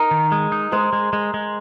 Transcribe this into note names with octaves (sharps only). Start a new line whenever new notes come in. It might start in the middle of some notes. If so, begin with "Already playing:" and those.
Already playing: D#4 A#4
D#3
G#3
D#4
G#3 C5
G#3
G#3
G#3